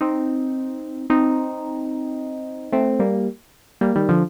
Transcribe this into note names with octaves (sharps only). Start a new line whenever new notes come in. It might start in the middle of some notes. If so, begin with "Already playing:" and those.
C4 D#4
C4 D#4
A3 C4
G3 A#3
G3 A#3
D#3 G3
D3 F3